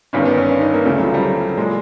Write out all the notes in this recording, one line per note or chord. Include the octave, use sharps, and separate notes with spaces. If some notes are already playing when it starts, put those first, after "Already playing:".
G1 G2 D#3 C#4
B3
C#4
D4
D#4
A#3
D2 C#3 E3 A3
F#3
F3
G3
F#3
A#2 G#3